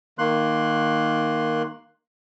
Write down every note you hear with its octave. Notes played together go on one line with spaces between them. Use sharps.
D#3 A#3 C6 F#6